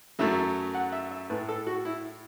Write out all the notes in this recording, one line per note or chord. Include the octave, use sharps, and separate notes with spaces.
F#2 F#3 A3 E5
F#5
E5
E5
A2 A3 B4
A4
F#4
E4